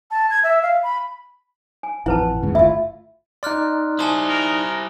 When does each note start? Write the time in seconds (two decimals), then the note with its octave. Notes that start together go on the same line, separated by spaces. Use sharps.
0.11 A5
0.30 G#6
0.43 E5
0.62 F5
0.83 B5
1.83 G#5
2.06 A1 F2 E4 B4 F#5 A5
2.43 D#2 G#2 C#3
2.55 G1 A3 E4 F4 E5
3.43 D#4 D5 C6 F6 F#6
3.99 E4 C5 G#5 A5 D#6
4.29 A#4